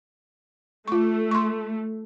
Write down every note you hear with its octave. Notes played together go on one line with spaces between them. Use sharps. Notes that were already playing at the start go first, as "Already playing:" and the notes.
A3 F4 C#6
C6 C#6